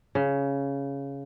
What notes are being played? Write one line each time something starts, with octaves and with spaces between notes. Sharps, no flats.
C#3